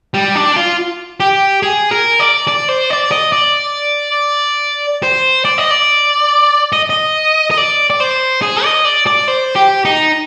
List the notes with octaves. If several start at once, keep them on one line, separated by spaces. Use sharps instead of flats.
G3
D4
F4
G4
G#4
A#4
D5
D5
C5
D5
D#5
D5
C5
D5
D#5
D5
D#5
D#5
D#5
D5
D5
C5
G#4
D#5
D5
D5
C5
G4
D#4